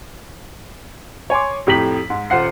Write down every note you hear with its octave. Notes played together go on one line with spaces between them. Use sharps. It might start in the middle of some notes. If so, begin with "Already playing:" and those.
C#5 G#5 C6 D6
F2 A2 G4 A#5 B6 F#7
G#2
D#1 F4 C5 F#5 C7